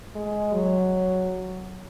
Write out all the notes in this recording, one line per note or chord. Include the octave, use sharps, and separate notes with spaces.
G#3
F#3